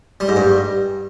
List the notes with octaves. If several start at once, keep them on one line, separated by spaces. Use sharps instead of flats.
G3
G#2
G2